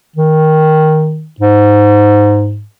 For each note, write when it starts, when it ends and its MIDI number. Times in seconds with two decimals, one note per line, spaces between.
0.16 1.29 51
1.40 2.64 44